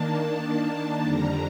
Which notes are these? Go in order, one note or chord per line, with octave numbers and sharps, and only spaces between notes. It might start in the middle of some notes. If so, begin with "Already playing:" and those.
Already playing: D#3 A#3 D4 A5
A5
A5
F2 D3 G3 A#5